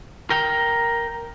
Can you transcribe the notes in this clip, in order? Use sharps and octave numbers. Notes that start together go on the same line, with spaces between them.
A#4 G5